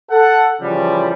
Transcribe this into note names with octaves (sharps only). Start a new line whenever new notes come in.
A4 F#5
C#3 E3 F3 G3